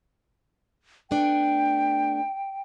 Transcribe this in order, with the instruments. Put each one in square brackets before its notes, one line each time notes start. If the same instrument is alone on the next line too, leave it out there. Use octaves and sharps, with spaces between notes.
[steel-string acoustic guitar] A3 B3 D4 [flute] G5